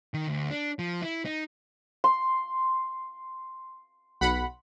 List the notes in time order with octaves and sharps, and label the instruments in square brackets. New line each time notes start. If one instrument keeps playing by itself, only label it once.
[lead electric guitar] D#3
D2
D4
F3
E4
D#4
[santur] C6
[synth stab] B1 F#5 B5